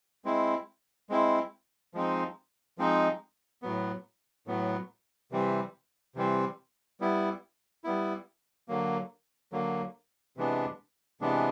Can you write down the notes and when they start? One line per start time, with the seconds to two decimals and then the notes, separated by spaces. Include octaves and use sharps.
0.25 G#3 C4 E4
1.09 G#3 C4 E4
1.94 F3 G#3 C4 D#4
2.78 F3 G#3 C4 D#4
3.62 A2 F#3 B3
4.47 A2 F#3 B3
5.32 C3 E3 G3 C4
6.15 C3 E3 G3 C4
7.00 G3 B3 E4
7.84 G3 B3 E4
8.68 D3 F#3 A#3
9.52 D3 F#3 A#3
10.37 C3 E3 G#3 B3 D4
11.21 C3 E3 G#3 B3 D4